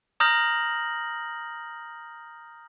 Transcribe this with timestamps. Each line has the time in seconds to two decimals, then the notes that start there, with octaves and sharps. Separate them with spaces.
0.20 A#5 D#6 F6 G6 A#6 F#7